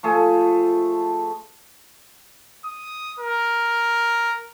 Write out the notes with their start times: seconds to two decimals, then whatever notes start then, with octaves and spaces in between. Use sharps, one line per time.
0.03 F3 A3 G#4 A4
2.65 D#6
3.19 A#4